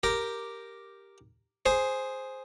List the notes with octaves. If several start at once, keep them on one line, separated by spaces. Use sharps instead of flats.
G4 A#4
G#4 C5